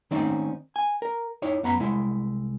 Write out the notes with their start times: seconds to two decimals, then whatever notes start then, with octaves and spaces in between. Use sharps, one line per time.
0.11 D#3 A3 C4 C#4 D#4 D5
0.76 G#5
1.02 A#4
1.42 D#4 E4 C#5
1.63 F#2 B3 A#5 B5
1.79 C2 G#3 E4